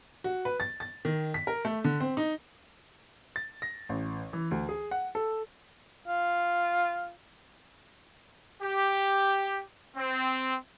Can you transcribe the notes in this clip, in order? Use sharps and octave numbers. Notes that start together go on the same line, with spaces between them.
F#4
B4
A6
A6
D#3
B6
A#4
A3
D3
C4
D#4
A6
A#6
A1
E3
D2
G#4
F#5
A4
F4
G4
C4